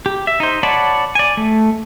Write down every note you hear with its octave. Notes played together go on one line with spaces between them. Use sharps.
G4
E5
D#4 C5
C#5 D5 F#5 A5 B5
D5 G#5
A3